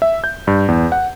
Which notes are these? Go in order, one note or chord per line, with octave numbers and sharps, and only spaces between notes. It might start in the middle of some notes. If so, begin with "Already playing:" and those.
E5
G6
G2
E2
F#5